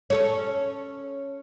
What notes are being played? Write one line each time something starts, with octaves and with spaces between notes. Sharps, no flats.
C#4 A4 C#5